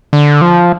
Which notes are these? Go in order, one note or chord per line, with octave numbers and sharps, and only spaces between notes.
D3
F3